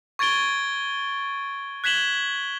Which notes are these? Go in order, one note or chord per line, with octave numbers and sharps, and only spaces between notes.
C#6 G#6 A6 D7 G7
F#6 G#6 B6 E7 F#7 G7